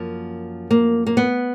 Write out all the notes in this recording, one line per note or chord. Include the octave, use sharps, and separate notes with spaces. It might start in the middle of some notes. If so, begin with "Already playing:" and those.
Already playing: F#2 F3 A#3
A#3
A#3
B3